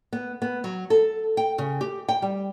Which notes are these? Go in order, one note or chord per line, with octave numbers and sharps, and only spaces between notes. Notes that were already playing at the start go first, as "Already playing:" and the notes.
B3
B3
F#3
A4
G5
C#3
G4
G5
G3